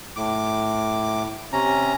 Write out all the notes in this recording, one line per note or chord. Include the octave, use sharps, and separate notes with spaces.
A2 D6
C3 C#4 A#5